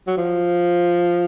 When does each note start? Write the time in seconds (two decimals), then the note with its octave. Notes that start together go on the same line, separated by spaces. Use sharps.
0.08 F#3
0.17 F3